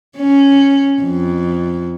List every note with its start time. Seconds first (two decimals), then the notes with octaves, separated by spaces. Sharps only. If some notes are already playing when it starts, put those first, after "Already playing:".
0.17 C#4
1.02 F2